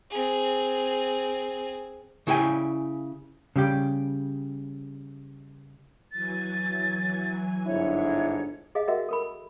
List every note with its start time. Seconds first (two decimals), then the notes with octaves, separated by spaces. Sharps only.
0.10 C4 G#4
2.27 C#3 E4 G4 G5 G#5
3.56 C#3 G3 G4
6.12 E3 F#3 G#5 A6
7.66 G1 G#2 D4 E4 C#5 C#7
8.75 G#4 D#5 F5
8.88 F#4 A#4 D#5 E5 F#5
9.09 A4 A#4 B5